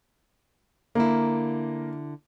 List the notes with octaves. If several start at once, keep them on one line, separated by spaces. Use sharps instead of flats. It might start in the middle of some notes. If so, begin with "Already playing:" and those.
D3 A#3 E4